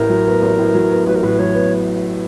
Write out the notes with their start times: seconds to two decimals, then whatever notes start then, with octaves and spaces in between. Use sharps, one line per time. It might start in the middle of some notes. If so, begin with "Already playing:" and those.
Already playing: A1 A2 A#4
0.10 F#3
0.27 B3
0.42 A1
0.59 A2
0.75 F#3
0.91 B3
1.06 A1 B4
1.15 A#4
1.23 A2 B4
1.39 F#3 C#5
1.55 B3